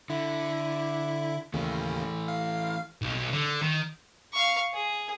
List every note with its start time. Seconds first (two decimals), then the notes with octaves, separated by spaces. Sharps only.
0.10 D3 E4
1.54 D#2 C#3 E3 A3
2.28 F5
3.02 B1
3.33 D3
3.62 D#3
4.33 F5 C#6
4.73 G#4